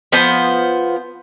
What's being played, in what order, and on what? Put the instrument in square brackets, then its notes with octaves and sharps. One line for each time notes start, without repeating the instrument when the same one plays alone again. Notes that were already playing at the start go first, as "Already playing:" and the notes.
[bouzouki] F3 B3 C5